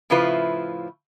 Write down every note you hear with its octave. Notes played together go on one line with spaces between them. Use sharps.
A2 C#3 F3 E4 F4 B4